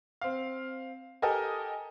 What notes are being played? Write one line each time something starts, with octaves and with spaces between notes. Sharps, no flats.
C4 F5
G4 A4 A#4 D#5 G#5